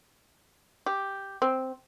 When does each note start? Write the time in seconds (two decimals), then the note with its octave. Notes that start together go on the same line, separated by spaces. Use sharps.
0.86 G4
1.42 C4